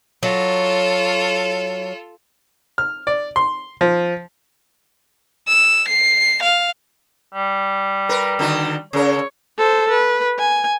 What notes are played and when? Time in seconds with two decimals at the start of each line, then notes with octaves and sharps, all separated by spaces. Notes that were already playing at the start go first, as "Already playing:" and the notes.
0.23 F#3 F4 A4
2.78 F6
3.07 D5
3.36 C6
3.81 F3
5.47 E6
5.88 C7
6.43 F5
7.34 G3
8.09 A#4 B4
8.39 D3 D#3 F#4
8.93 C#3 A#4 C#5
9.58 A4 C5
9.90 B4
10.39 G#5